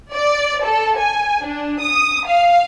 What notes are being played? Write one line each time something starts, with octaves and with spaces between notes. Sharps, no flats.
D5
A4
G#5
D4
D#6
F5